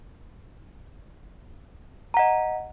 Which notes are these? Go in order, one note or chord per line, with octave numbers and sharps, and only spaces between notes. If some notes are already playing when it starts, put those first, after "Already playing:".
D#5 F#5 A#5